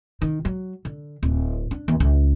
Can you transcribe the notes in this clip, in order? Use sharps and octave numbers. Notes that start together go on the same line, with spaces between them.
D#3
F#3
D3
D1
D4
D#2
C#2